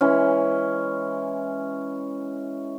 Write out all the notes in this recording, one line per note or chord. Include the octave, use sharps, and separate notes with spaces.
E3 G#3 C#4